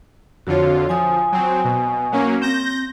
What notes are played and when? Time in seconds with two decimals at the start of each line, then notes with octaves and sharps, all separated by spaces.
0.47 F2 D3 F4 F#4 C#5
0.89 F3 G#5 D#6
1.32 F#3 C4
1.64 B2
2.12 F#3 A#3 C#4
2.42 C4 G6 A#6